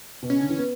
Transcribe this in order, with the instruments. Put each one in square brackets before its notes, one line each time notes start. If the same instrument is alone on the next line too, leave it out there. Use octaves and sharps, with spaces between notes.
[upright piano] B2
[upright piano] C#3 [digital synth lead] C#4
[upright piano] D3
E3
B3